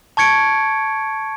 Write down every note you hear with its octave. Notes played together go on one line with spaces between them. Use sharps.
A5 C#6 G#6 C#7 D7